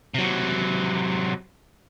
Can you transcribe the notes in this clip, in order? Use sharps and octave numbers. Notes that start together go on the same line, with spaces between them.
C3 F#3